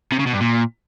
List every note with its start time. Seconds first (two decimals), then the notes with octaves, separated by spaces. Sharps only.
0.12 C3
0.19 C#3
0.26 B2
0.33 G2
0.40 A#2